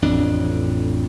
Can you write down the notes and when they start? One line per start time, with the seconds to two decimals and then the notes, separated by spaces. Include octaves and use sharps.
0.02 A1 F2 A2 D4